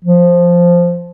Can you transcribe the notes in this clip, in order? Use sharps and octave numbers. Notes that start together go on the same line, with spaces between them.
F3